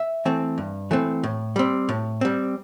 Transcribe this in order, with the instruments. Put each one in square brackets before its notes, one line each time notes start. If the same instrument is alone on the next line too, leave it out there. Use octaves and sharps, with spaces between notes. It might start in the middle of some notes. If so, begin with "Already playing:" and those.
Already playing: [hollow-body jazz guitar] E5
E3 A3 C4
G2
E3 A3 C4
A2
G3 C4
A2
G3 C4